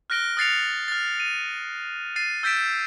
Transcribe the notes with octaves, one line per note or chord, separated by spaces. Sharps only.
F6 F#6 A#6 D7 G7
D#6 F#6 A6 C7 C#7 F7
F6 A6
D#7
A6 C7 D#7
E6 G6 A6 B6 D7 E7